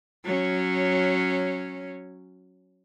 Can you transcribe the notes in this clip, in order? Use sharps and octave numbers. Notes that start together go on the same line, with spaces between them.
F#3 C#4